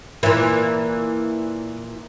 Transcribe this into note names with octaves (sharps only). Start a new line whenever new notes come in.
A#2 E3